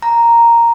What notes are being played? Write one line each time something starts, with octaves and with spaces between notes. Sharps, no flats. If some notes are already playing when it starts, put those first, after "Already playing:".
A#5